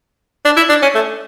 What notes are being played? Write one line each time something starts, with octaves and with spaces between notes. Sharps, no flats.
D4
E4
D4
C#4
A3